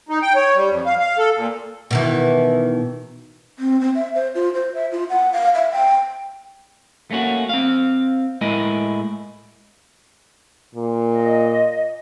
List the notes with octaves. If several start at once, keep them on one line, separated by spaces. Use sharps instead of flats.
D#4
G5
C#5
G3
F2
F5
F5
A4
A#2
B2 D#3 E3
C4
C4
E5
C5
F4
C5
E5
F4
F#5
F5
E5
G5
A3 A#3 C#4 F#4
C4 F5
A2 G#3 E4 A#4 D#5
A#2
D#5